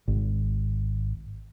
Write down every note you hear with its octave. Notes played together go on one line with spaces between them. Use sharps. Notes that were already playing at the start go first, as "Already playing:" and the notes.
G#1